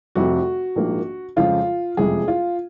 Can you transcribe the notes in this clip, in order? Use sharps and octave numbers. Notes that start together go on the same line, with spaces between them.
F1 F2 C3 F3 F#4
A#1 G#2 F3 A#3
F2 C#3 F3 G#3 F4
F#1 F2 C3 F3 G#3 G#4
F4